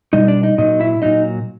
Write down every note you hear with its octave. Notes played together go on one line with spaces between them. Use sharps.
B2 G3 D#4 D#5
D4 D5
D#4 D#5
A#2 F#3 D#4 D#5
E4 E5
A#2 F#3 D#4 D#5